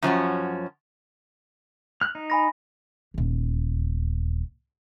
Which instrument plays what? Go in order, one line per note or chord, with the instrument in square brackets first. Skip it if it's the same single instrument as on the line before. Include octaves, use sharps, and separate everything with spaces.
[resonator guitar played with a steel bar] F#2 F3 C#4 F#4
[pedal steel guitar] F6 F#6
D#4
[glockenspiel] G#5 B5 A#6
[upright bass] D#1 E2